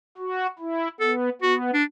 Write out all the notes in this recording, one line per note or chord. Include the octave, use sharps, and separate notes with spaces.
F#4
E4
B3 A4
B3 F#4
D4